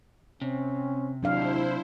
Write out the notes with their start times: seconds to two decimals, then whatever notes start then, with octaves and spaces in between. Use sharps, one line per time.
0.41 C3 C4 C#4
1.23 A#1 D#2 F#3 D4 E4 C5 F5